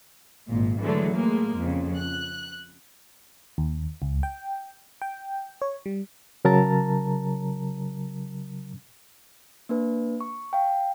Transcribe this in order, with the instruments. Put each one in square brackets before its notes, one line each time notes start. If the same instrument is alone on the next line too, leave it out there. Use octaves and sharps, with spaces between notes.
[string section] G#1 A#2
D3 E3 F#3 G#3 A3
A2 G#3 A#3
F2 C#3
F#6
[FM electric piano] D#2
C#2
G5
G5
C#5
G3
[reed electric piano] C#3 F#3 A#4 A5 A#5 A6
[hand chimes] A#3 D4 B4
C#6
F5 G5